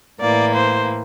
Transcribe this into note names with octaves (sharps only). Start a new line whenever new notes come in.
A2 E3 A#3 D5
C5